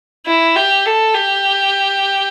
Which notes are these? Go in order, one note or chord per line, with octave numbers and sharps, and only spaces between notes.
E4
G4
A4
G4